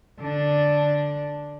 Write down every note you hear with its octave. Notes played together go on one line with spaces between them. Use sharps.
D3 D4